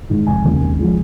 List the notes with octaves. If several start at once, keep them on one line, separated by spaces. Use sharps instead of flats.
G#2 D#3 G#3
F1 G#5
D#2 C#3 A#3
G#1
F3 G#3